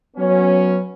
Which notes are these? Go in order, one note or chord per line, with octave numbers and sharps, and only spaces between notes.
F#3 B3 C#4